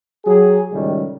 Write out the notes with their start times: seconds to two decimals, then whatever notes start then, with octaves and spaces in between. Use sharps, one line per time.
0.25 F#3 G4 G#4
0.72 C#2 A2 D#3 G3